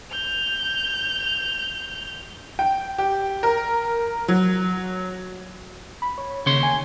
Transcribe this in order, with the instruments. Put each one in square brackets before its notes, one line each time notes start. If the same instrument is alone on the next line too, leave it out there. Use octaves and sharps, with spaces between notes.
[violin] G6 F7
[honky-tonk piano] G5
G4
A#4
F#3
[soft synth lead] B5
C#5
[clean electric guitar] D#2 C#5 C6 [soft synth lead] C#3
[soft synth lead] G#5